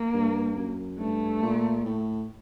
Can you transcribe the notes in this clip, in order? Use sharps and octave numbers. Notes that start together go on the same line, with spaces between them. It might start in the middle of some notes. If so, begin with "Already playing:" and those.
Already playing: A#3
G2
F#2
G2 A3
A#2
A2